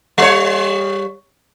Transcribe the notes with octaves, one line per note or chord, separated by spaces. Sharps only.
G3 C#5